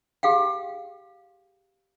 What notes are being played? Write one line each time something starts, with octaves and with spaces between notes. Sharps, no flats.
G4 G#4 F5 G5